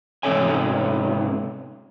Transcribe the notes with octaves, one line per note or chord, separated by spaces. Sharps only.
G#2 C3 C#4 A4 C#5 G#5